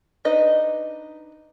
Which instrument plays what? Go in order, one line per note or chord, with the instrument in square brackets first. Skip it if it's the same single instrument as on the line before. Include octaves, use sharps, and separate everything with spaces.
[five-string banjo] D4 D#4 B4 D#5